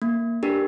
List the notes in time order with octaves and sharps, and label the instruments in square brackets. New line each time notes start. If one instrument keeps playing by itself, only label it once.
[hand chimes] A#3
D4 G4 A#4